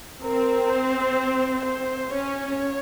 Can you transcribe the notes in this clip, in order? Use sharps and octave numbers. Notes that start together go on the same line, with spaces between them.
C4 A#4
C5
C5
C#4 C#5